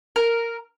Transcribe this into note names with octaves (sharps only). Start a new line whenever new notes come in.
A#4